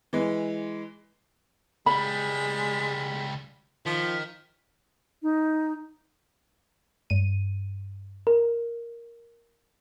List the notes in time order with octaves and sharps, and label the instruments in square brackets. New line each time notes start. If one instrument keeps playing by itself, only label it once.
[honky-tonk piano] E3 G#3
[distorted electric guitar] C#2 G3 [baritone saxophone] G#3 [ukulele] B5 [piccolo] B6
[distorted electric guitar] D#3 [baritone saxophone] F3 [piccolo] B6
[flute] D#4
[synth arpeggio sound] G2 D#7
A#4